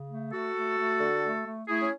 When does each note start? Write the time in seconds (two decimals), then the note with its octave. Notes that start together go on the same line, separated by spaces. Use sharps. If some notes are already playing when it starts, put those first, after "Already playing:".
Already playing: C#3
0.09 A3
0.32 A3 F#4 A4
0.55 A3
0.78 A3
1.00 D3
1.23 A3
1.46 A3
1.68 A3 E4 G#4
1.80 C#4